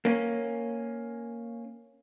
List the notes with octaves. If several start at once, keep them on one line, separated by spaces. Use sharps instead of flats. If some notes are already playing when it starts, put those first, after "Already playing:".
A#3 C#4